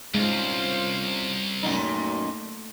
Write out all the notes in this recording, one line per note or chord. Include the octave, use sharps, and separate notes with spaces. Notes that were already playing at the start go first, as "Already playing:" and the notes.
C2 G#3 C#4 F4 C5
F#2 A#2 A3 A#3 D#4